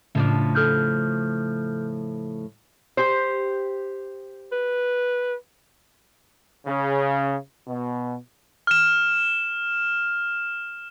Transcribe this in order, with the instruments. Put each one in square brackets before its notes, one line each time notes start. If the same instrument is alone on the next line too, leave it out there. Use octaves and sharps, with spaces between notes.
[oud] A2 F3 D4 [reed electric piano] C#3
[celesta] A4 F6 G6
[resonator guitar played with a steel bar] G4 C5
[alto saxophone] B4
[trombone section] C#3
B2
[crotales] F6 E7